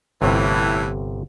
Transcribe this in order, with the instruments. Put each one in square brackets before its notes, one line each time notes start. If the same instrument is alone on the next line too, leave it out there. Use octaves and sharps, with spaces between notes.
[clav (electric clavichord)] G1 C3 C#5 [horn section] A2 E3